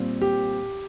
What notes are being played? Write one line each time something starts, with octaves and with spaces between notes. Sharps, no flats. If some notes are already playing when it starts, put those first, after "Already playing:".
Already playing: A#2 G3 C4
G4